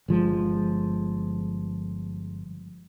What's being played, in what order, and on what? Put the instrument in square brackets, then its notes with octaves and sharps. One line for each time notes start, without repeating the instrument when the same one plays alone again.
[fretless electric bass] G1 F3 G#3